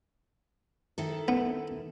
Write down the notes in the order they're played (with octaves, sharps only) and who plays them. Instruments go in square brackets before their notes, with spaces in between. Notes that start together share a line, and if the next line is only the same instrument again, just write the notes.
[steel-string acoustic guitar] D#3 E4 A4
[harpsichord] B3